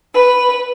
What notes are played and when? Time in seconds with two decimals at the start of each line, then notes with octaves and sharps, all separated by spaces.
0.14 B4